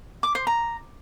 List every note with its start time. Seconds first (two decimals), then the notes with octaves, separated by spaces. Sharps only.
0.23 D6
0.35 C5
0.47 A#5